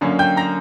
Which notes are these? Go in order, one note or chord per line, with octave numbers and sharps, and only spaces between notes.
F#2 D3 A#3 C#4
G5 G6
A#5 A#6